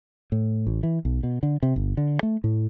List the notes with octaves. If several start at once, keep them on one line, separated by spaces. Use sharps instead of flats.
A2
A1
E3
B1
B2
D3
C3
G1
D3
A3
A2